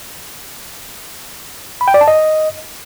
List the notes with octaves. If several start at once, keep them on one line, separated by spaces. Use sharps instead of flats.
B5
G5
D5
A5
D#5